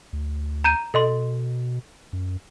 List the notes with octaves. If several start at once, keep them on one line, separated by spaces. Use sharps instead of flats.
D2
A#5 G6 D#7
B2 A4 D#5 C6
F#2